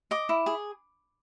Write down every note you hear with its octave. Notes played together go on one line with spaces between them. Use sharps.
D#5 D6
E4
G#4